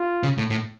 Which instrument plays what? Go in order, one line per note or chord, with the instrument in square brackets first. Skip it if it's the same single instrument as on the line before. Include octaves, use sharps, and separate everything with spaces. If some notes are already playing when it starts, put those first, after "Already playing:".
Already playing: [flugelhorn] F4
[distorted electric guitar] C#3
A2
A2